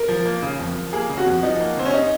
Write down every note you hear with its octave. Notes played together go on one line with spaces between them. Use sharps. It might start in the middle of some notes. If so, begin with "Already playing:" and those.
Already playing: A#4
F3
A#3
C#3
F2
F3
A#3 G#4
C#3
F#4
F2
F3 D#4
A#3
C#3 C4
C#4
D#4